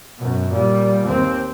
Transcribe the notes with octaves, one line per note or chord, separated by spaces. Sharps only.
F#2 B2
A#2 G3
D#2 C4